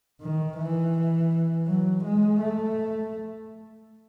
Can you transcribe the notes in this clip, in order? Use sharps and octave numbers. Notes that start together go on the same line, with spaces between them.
D#3
E3
F#3
G#3
A3